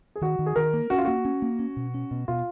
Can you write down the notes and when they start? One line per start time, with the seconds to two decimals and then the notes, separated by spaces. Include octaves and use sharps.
0.15 G#4
0.21 D#3 F#4
0.39 D#3
0.46 G#4
0.56 D#3 A#4
0.73 A#3
0.90 C#4 F#4
0.98 F4
1.05 A#3 F#4
1.25 C#4
1.42 A#3
1.59 C#4
1.77 B2
1.94 C#4
2.11 B2
2.28 B2 F4